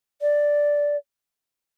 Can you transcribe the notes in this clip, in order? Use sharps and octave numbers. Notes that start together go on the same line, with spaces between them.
D5